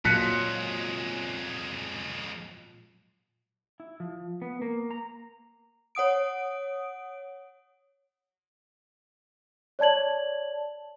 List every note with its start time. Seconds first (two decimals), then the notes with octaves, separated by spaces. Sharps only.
0.05 F2 A#2 F#3 G#3 F4 F#6 B6 C#7
3.80 E4
4.00 F3
4.42 B3
4.62 A#3
4.91 A#5
5.95 C#5 F#5 D#6 D7
9.79 C#5 D5 A5 G#6 F#7